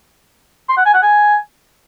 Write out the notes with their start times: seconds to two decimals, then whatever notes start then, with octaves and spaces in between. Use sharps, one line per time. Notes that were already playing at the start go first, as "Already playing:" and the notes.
0.69 C6
0.77 F#5
0.86 G#5
0.94 F#5
1.03 G#5